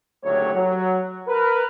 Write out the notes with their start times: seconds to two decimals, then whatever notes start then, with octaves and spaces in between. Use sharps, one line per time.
0.24 F#1 D2 F#3 A3 G4 C#5
0.55 F#3
1.28 A#4 B4